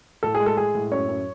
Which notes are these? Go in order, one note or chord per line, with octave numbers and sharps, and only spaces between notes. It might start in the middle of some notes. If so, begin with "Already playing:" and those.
A2 A4
G#4
G#3
A4
G#3 G#4
A2
F#2 C#5
F#2